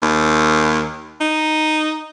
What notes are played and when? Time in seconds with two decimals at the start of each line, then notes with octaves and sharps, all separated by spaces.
0.02 D#2
1.21 D#4